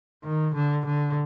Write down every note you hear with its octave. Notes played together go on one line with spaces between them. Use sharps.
D#3
D3
D3